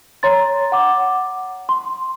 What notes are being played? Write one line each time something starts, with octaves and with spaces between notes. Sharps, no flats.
C#5 A#5 C6 A6
F#5 D6
C6